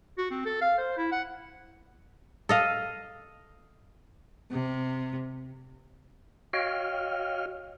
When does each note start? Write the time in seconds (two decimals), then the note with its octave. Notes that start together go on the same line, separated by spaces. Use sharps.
0.18 F#4
0.31 C4
0.46 A4
0.61 F5
0.78 C5
0.97 E4
1.12 F#5
2.49 A4 D#5 F5
4.50 C3
6.53 F#4 C#5 D#5 F5 G5 F6